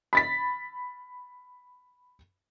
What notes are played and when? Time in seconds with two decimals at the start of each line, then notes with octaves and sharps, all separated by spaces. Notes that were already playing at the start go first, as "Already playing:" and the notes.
0.13 B5 A6 B6